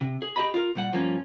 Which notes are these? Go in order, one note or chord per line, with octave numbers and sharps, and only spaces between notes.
C3
G#4
G4 G#4 D#5 A#5 B5
F4 A#4
A#2 G3 F#5
G2 F3 A#3 C#4